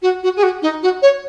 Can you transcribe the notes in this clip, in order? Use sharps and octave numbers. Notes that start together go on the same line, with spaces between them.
F#4
F#4
G#4
F#4
D#4
F#4
C#5